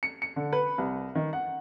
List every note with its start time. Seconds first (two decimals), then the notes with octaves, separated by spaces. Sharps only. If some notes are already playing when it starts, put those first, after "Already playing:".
0.03 C#7
0.22 C#7
0.36 D3
0.53 B4
0.78 C2
1.15 D#3
1.33 F#5